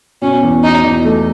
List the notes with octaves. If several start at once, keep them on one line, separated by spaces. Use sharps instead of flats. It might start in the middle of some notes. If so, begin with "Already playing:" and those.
B2 C#4
E2
B2 D#4
E2
A3